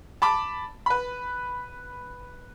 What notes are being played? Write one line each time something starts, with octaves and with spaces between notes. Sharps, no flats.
A5 B5 D6
B4 B5